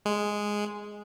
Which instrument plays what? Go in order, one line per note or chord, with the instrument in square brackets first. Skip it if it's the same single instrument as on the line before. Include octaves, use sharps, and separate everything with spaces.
[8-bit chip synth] G#3